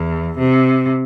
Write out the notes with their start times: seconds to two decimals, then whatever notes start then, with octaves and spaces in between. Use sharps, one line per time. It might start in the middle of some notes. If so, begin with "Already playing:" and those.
Already playing: E2
0.38 C3